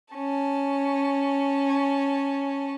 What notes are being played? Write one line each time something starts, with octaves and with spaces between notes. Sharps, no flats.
C#4 A5